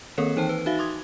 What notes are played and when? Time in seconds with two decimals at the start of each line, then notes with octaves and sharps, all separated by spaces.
0.18 D#3 A#3 C4 A4 A#4 C#5
0.36 E3 D#4 C5 G5 A5
0.49 B4
0.66 D#4 F#4 E5 F5
0.79 C6 D6 D#6 G#6